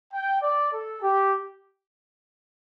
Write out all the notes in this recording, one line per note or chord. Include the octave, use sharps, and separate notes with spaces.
G5
D5
A4
G4